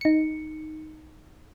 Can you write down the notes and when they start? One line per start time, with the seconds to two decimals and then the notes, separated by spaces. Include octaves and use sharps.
0.01 D#4 C#7